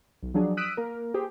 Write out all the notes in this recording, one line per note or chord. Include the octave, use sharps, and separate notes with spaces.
B1
F3 F#3 D4 G#4
D#6 E6 F#6 B6 D7 D#7
A#3 A#4
G4 G#4 C5